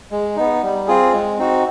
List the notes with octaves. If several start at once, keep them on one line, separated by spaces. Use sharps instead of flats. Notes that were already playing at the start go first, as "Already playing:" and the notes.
G#3
B3 D#4
G3
C4 F4 G#4
G#3
C4 D#4 F#4